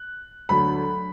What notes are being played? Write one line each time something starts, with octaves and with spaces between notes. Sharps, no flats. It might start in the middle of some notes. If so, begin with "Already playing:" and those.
Already playing: F#6
D2 D3 F#3 B5